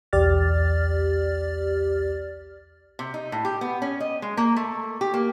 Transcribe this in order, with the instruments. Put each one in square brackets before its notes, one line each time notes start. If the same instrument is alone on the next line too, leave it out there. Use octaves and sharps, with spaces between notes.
[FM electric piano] B1 E2 G4 D5 F6 A6
[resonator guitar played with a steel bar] C3
D#4
A2
G4
B3
C#4
D#5
G#3
A#3
A3
G4
A#3